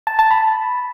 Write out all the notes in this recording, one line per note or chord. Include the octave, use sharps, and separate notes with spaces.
A5
A5
B5